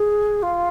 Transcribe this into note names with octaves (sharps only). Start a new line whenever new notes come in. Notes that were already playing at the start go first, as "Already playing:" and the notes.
Already playing: G#4
F4